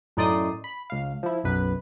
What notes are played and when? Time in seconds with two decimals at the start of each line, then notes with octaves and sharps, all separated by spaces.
0.17 F#2 A2 D#4 D5 C6 D#6
0.64 B5
0.90 C#2 F5
1.23 F3 E4
1.44 B1 F#2 B4